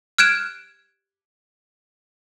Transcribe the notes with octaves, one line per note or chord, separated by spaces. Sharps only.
F6 F#6 G#6 D7 E7